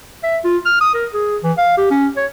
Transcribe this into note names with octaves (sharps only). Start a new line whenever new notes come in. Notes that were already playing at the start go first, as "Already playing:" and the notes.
E5
F4
F6
D#6
A#4
G#4
E3
F5
G4
C#4
C#5